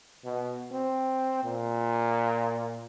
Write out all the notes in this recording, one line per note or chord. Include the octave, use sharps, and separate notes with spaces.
B2
C4
A#2